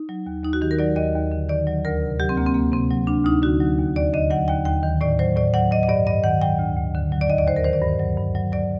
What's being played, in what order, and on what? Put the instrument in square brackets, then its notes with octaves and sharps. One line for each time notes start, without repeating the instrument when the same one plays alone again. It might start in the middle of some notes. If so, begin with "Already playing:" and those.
Already playing: [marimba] D#4
F#3
D#2
D#2 D#4
F#4
D#3 G4
A#4
F#3 D5
D#2 D#5
D#2
D3
D#3 D5
F#3
D2 A#4
C3
F#3 G4
C4
D2 A#3
C4
D2 A#3
C3 C4
F#3
D2 D4
D2 D#4
D3 F#4
F#3
D#2
D#2 D5
D3 D#5
F#3 F#5
D#2 G5
D#2 G5
D#3
A2 D5
F#3 C5
A2 D5
F#3 F#5
F#3 D#5
D#5
G2 D5
G2 D#5
D#3 F#5
F#3 G5
D2
D2
D3
F#3
D5
D#2 D#5
D5
D#2 C5
A#4
D#3 C5
D5
G2
F#3
G2
F#3
F#3 D5